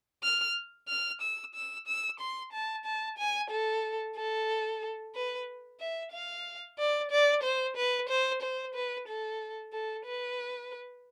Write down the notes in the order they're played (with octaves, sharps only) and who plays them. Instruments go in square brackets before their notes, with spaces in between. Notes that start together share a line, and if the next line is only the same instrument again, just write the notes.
[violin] F6
F6
E6
E6
E6
C6
A5
A5
G#5
A4
A4
B4
E5
F5
D5
D5
C5
B4
C5
C5
B4
A4
A4
B4